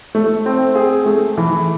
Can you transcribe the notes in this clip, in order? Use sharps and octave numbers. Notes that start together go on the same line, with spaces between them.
A3
C4
G#4
A3
E3